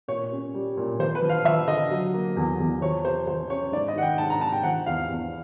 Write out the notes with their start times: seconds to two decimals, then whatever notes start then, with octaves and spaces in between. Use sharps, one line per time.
0.08 A#2 C#5
0.32 C#4
0.54 G3
0.77 A#2
0.99 F3 C5
1.15 B4
1.22 F3
1.29 F5
1.44 F3 E5
1.67 D3 D#5
1.90 F#3
2.14 A#3
2.36 E2
2.59 E2
2.82 F3 C#5
3.05 C3 C5
3.27 F3 C5
3.50 C#4 C#5
3.72 G#2 D5
3.88 D#5
3.95 D#3 F#5
4.02 G5
4.18 G#2 A5
4.30 A#5
4.41 G#2 A5
4.53 G5
4.63 F3 F#5
4.86 E2 F5
5.09 E2